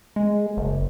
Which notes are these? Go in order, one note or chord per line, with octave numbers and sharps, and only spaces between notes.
G#3
F#1